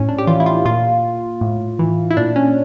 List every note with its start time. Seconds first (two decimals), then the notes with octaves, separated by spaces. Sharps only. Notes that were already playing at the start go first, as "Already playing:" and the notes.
Already playing: A2 C#4
0.09 D4
0.18 G4
0.27 E3 F4
0.40 E4
0.46 F4
0.65 A#2 F4
1.41 A2
1.79 E3
2.11 E4
2.17 A#2 D4
2.36 C#4